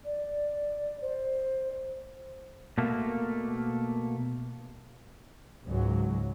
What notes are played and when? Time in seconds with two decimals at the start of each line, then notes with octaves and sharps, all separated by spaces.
0.05 D5
1.02 C5
2.78 B2 A3 A#3
5.67 C#2 G#2 F#3